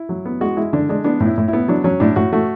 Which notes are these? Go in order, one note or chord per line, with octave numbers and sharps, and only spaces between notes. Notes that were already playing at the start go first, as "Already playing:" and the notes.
Already playing: E4
F#3
B3
G#3 F#4
G#3 E4
D3 D4
G#3 D4
B3 D4
A2
E4
A2
E4
B3
F#3 D4
F#3 C#4
A2 D4
A2 F#4
A3 F#4